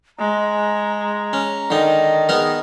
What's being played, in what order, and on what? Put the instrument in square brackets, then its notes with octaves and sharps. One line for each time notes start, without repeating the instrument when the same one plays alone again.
[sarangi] G#3 [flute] A#5
[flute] A#5
[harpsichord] C#4
[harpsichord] D3 D#4 [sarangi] D#3
[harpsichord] B3 D#4 A#4 [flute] G#4